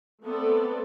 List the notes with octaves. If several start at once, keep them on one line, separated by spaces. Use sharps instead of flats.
A3 B3 C4 A4 D5